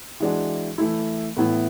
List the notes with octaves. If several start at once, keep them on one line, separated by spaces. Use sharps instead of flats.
E3 G#3 D4 F#4
E3 A3 E4
A2 E3 B3 E4